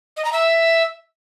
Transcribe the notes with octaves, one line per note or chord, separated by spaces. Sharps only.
D#5
A#5
E5